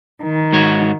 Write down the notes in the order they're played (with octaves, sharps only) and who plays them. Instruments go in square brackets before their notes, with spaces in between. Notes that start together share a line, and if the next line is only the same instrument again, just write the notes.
[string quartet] D#3
[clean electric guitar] G#2 F#4 C#5